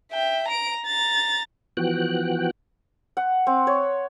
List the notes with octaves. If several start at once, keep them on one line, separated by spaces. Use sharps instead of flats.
E5 G5
A#5 D7
A#5 A6
E3 F3 B3 F#4 G5 F#6
F#5
C4
C#5